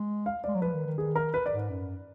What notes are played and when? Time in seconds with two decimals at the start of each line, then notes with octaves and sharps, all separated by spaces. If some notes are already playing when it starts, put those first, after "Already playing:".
Already playing: G#3
0.26 F5
0.44 G#3 D5
0.55 F#3
0.62 F3 B4
0.74 D#3
0.86 D#3
0.98 D#3 G#4
1.16 A#4
1.34 B4
1.46 D5
1.52 G#2
1.70 F#2